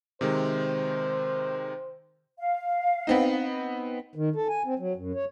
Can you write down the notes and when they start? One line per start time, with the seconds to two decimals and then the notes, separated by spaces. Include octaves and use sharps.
0.21 C3 D#3 G#3 C5
2.38 F5
3.07 B3 C4 D#4
4.16 D#3
4.36 A4
4.49 G#5
4.65 C4
4.79 F#3
4.96 F#2
5.15 C#5